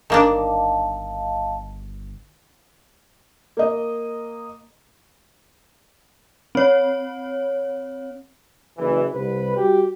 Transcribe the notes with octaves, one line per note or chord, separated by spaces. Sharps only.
G1 D#3 A#3 D4 D#5 F5 A5
A#3 D#5
C4 C#5
F#1 E3
C2 B4
G3 F#4 G4